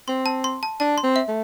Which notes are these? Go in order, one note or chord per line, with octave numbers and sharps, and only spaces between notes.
C4 C6
A5
C6
A5
D4 A5
C6
C4
E5
A3